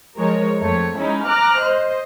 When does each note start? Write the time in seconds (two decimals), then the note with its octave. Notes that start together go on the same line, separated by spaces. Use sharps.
0.17 F3 G#3 A#4 C#5
0.59 F2 A3 C#5
0.98 G#3 C#4 D#4 E4
1.26 A#5 D6 F6 F#6
1.61 C5 D#5